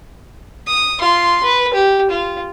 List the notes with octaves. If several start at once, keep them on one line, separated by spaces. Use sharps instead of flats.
D#6
F4 C6
B4
G4
F4